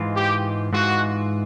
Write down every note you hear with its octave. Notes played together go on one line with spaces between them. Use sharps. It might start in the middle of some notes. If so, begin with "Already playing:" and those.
Already playing: G#2 E3 G#3 F4
G4
G#2 E3 G#3 F4 F#4